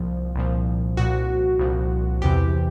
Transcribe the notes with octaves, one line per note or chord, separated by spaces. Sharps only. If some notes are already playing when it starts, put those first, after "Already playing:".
Already playing: C2 A#2 F3
C2 A#2 F3
C2 A#2 F3 F#4
C2 A#2 F3
E2 C3 E3 G4